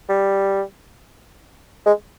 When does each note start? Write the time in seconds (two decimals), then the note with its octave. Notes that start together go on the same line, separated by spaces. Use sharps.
0.09 G3
1.86 G#3